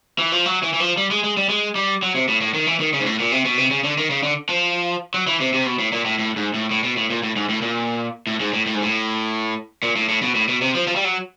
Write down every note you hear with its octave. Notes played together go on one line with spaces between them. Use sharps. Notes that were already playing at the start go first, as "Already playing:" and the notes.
E3
F3
F#3
E3
E3
F3
G3
G#3
G#3
G3
G#3
G3
F#3
C3
A2
A2
D#3
E3
D#3
C#3
G#2
A2
A#2
C3
B2
C3
C#3
D3
D#3
C#3
D3
F3
F#3
E3
C3
C3
B2
A2
A#2
A2
A2
G#2
A2
A2
B2
A2
A#2
A2
G#2
A2
A#2
A2
G#2
A2
A2
G#2
A2
A#2
A2
A2
B2
A2
B2
C3
F3
F3
G3
F#3